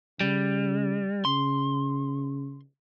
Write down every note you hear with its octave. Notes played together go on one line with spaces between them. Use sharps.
C#3 G3
C#3 C6